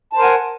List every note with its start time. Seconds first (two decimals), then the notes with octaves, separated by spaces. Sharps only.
0.13 A5
0.16 C5
0.18 A#4
0.21 G#5
0.23 F#5